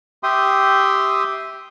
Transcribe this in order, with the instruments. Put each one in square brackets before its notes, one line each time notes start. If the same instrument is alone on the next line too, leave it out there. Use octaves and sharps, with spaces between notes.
[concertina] G4 E5 G5 C6 D#6